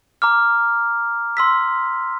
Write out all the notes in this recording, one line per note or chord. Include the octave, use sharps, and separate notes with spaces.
A#5 D6 F6
C6 E6 B6